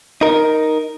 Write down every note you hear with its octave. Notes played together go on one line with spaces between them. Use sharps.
D#4 A#4